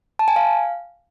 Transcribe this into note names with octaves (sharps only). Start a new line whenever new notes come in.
A5
G#5
F5